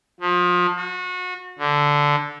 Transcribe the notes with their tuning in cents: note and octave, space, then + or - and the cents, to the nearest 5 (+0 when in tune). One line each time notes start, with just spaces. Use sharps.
F3 +30
F#4 -30
D3 -5